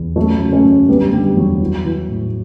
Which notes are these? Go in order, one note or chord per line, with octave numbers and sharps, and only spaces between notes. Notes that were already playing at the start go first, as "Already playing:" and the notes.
Already playing: E2
F#2 F#3 A3
C#3
A3 C#4
F#2
D3 G3 B3
D3 G3
E2 F#3
E3
E3
A2